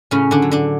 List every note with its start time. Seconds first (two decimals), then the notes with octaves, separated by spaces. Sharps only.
0.11 A2 C#3 C#4
0.31 D3 D4
0.42 F#3
0.51 D3 D4